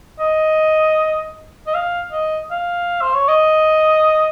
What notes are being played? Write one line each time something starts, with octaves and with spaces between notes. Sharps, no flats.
D#5
D#5
F5
D#5
F5
C5
C#5
D#5